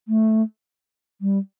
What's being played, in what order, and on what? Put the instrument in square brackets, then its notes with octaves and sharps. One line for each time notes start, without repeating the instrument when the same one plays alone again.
[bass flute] A3
G3